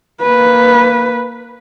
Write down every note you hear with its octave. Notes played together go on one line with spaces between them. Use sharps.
A#3 B4